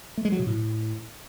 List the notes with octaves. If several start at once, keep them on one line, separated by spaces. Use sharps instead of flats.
A3
G#3
F#3
B2
A2